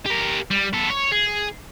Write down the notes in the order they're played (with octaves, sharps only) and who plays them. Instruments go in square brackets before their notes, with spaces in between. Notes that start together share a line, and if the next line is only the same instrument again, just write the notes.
[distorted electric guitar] G4 A#4
G3
B3 A4
C#5
G#4